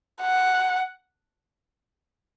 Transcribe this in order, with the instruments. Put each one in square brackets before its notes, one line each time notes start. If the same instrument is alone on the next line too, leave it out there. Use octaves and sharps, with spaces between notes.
[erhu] F#5